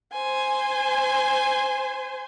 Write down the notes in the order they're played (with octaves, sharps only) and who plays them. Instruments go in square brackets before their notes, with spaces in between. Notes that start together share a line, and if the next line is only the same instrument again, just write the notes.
[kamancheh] C5 G#5